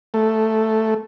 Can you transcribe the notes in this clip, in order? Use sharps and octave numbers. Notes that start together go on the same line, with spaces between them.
A3